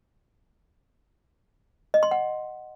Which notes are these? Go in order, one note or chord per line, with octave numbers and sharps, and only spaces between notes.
D#5
C6
F#5